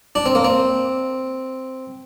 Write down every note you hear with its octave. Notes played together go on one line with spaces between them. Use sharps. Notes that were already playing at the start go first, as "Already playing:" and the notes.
D4
C4
A#3
C4